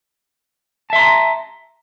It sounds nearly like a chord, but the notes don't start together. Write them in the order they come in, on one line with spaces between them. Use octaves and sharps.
A5 E5 C6 A#5